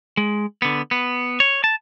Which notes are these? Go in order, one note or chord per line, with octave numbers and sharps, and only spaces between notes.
G#3
D3 B3
B3
C#5
A5